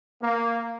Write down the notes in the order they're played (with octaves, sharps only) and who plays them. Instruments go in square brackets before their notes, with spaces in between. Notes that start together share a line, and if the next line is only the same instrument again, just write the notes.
[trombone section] A#3